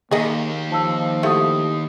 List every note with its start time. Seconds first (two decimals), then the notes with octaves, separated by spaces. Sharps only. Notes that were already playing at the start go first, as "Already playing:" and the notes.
0.11 D#2 A#3 G#4 D#5
0.72 F3 A5 E6
1.23 A3 E4 F#4 G4 D#6